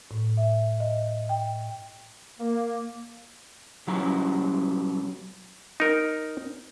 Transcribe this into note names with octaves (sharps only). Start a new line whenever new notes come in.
A2
E5
D#5
G5
A#3
B2 F#3 G3 C#4 E4 A#5
D#4 A#4